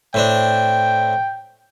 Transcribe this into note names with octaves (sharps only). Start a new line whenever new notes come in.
A2 C4 D4 G5